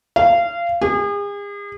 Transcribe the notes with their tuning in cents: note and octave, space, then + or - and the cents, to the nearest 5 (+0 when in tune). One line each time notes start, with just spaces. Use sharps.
F5 -25
G#4 -40